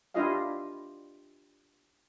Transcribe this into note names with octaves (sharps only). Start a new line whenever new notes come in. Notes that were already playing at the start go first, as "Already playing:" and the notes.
D4 E4 F4 G4 D#5 F5